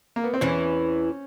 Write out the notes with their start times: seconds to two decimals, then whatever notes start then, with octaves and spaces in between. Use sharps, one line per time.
0.16 A#3
0.24 B3
0.34 C4
0.41 E2 E3 C#4